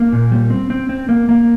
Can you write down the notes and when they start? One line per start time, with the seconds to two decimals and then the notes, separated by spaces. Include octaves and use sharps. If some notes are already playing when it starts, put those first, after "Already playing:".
Already playing: A#3
0.12 A#2
0.31 G3
0.50 C4
0.70 C4
0.89 C4
1.09 A#3
1.29 A#3